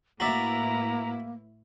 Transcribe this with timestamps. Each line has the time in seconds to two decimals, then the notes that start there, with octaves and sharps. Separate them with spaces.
0.20 A2 A#3 E4 F#4 B4 D5 E5 A#5